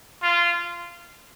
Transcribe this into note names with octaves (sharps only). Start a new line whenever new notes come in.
F4